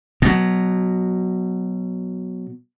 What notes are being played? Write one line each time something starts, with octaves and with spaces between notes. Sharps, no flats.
B2 F#3